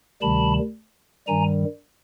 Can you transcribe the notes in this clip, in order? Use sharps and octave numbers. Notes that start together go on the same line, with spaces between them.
D2 C3 D#3 G3 A5 B5
G2 D#3 G3 G#5 A#5